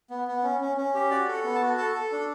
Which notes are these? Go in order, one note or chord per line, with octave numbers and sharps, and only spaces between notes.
B3
B3
C#4
C#4
C#4
G4
F#4 D5
A4
F#5
B3
A5
F#4
A4 A5
A4
D4